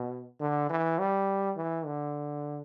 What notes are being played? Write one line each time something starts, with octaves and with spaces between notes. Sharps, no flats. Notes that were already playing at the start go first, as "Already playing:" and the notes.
Already playing: B2
D3
E3
G3
E3
D3